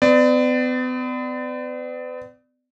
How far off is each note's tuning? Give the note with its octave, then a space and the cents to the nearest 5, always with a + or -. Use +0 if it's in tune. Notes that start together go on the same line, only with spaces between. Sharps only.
B3 +45 D5 +15